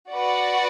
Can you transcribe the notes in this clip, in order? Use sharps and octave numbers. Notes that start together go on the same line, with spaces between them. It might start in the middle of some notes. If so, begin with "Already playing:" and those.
F#4 B4 D5 F#5